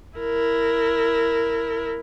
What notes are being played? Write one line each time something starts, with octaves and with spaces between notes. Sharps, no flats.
E4 A#4